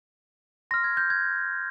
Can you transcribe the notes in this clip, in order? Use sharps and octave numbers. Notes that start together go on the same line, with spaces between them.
C6 F6 A#6
G#6
G6
G#6